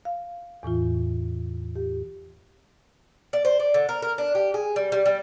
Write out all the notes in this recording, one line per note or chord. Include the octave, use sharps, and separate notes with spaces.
F5
E2 A2 E3 F4
G4
D5
C5
D5
D3
A#4
A#4
D4
G4
G#4
G3
G3
G3